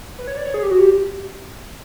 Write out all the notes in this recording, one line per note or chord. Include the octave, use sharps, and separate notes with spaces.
B4
C#5
D5
C#5
G#4
G4
F#4
G4